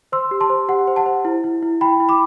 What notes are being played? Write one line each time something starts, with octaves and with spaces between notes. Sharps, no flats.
C5 C6 E6
G4
A5 C6
C5
G4 F#5
C5
F#5 A5
C5
E4
E4
E4
E4 G5 B5
E4
B5 D6